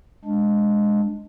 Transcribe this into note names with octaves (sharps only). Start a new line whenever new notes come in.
G#3 D4